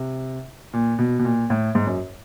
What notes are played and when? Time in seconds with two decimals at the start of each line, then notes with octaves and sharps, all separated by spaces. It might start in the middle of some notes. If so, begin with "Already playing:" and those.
Already playing: C3
0.73 A#2
0.99 B2
1.19 B2
1.25 A#2
1.50 A2
1.75 G#2
1.87 F#2